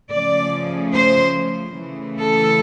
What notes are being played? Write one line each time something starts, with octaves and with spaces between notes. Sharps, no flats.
C#3 F3 A3 C#4 D5
C5
C#3 E3 A3
A4